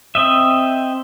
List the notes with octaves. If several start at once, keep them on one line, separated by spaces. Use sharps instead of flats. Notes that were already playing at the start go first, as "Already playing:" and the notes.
C4 D#5 E5